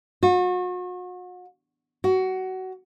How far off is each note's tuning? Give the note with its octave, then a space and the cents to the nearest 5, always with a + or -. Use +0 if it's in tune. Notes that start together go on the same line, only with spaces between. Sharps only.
F#4 -40
F#4 +20